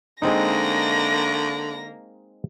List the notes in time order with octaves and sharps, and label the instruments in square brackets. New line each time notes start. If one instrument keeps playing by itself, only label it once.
[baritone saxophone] D3 [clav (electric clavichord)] G#3 C4 D#4 [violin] A#3 A#6